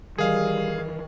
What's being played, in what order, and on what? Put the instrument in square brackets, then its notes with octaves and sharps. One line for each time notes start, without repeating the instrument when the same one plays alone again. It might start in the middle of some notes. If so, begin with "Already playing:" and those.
[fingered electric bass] D#3 E3 [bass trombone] G3 [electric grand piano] G#4 F5 [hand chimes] A#4 D#5